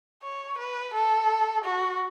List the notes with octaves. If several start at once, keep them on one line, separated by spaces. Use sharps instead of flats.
C#5
B4
A4
F#4